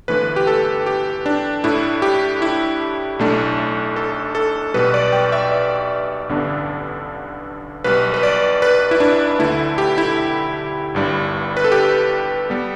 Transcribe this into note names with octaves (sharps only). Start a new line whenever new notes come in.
G1 G2 E3 A3 B4
G4
A4
G4
D4
A2 A3 D4 E4
G4
E4
B1 A2 A3 D4
A4
A4
B1 B2 G3 B4
D5
G5
E5
D5
A1 G2 D3 B3 D4
B1 B2 G3 B4
B4
D5
B4
E4
D4
D2 D3 A3 E4
G4
E4
G1 G2 G3
B4
A4
G4
G3 B3